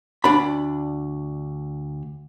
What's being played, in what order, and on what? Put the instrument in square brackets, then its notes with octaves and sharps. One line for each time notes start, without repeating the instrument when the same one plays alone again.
[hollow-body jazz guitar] D2 D4 B5